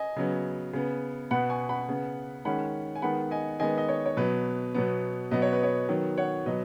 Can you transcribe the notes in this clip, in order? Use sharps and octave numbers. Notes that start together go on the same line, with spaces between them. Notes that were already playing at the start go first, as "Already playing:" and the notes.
Already playing: D#5 G#5
C#3 F#3 B3
C#3 B3
B2 B3 F#5 B5
G#5 C#6
F#5 B5
C#3 B3
D#3 G#3 C#4 F#5 B5
G#5
D#3 G#3 B3 F#5 B5
D#5 G#5
D#3 G#3 B3 D#5 G#5
D#5
C#5
C#5
B2 F#3 B3 B4
B2 F#3 B3
B2 F#3 B3 D#5
C#5
B4
C#5
D#3 F#3 B3
C#5 F#5
B2 F#3 B4 D#5